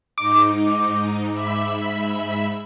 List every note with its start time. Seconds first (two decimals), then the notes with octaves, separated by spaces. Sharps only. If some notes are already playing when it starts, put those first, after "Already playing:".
0.18 G#2 D#4 D6
1.33 G#2 E5 B5